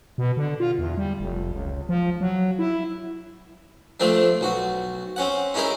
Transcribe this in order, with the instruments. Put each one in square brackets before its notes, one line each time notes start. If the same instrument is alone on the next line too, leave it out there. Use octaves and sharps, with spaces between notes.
[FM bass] B2
D3
F4
E2
G3
F1
C#2
F3
F#3
E4
[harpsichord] F3 A3 C4 D4
B1 F#4
C4 C#4 F#5
C#4 D#4 E4 G#4 A#4